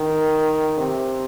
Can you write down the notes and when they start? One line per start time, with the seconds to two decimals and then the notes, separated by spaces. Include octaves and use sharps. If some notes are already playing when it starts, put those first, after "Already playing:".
Already playing: D#3
0.78 C3